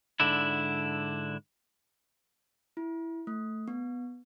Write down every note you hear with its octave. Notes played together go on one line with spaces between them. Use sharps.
G#2 D3 D4 E4
E4
A3
B3